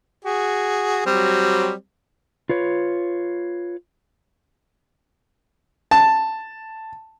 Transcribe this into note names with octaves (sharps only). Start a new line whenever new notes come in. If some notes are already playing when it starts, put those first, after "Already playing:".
F#4 G#4
F#3 G3 C4
F4 B4 C#5
A5